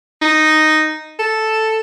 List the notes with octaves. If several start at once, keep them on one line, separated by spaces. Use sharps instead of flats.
D#4
A4